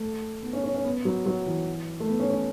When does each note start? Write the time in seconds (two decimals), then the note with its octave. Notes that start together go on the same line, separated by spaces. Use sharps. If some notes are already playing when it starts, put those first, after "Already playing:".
Already playing: A3
0.43 B3
0.53 C#4
0.64 C#4
0.74 C#4
0.85 B3
1.05 F#3
1.26 F#3
1.47 E3
2.00 A3
2.09 B3
2.20 C#4
2.30 C#4